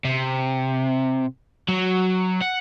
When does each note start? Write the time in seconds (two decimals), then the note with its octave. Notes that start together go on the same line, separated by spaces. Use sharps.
0.05 C3
1.69 F#3
2.42 F#5